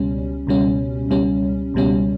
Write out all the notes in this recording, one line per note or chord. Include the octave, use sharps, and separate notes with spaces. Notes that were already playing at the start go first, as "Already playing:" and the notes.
Already playing: C#2 B2 G3 C#4
C#2 B2 G3 C#4
C#2 B2 G3 C#4
C#2 B2 G3 C#4